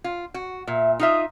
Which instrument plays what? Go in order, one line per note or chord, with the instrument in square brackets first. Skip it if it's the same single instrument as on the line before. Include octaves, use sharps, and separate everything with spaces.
[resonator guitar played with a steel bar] F4
F#4
[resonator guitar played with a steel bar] A#2 [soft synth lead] E5
[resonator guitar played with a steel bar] D#4 F4 E5 [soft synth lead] D#6